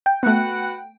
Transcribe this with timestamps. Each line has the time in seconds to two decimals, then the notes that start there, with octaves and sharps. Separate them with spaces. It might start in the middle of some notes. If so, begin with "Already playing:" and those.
0.06 G5
0.23 A3 B3 F#4 B4 F#5